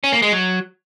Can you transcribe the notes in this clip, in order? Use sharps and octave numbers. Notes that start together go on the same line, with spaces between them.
C#4
A#3
G#3
F#3